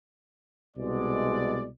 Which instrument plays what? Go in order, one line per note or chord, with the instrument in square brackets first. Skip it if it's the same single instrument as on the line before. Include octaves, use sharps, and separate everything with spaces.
[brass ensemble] C2 B2 G#3 D5